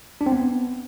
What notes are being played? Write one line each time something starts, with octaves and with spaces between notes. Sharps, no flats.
D4
C4
B3